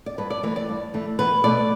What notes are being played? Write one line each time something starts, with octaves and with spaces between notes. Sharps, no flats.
D5
G2 B4
D5
E3 A3 B4
D5
G2
E3 A3
E2 B4
B2 A3 D5